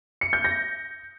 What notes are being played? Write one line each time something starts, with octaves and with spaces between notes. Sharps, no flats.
C#7
G6
A#6